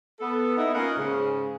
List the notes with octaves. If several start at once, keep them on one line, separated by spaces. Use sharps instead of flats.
B3 A4
B3 D#4 E4
A#3 C#4 F4 A#4 D#5 F#5
G#2 C#3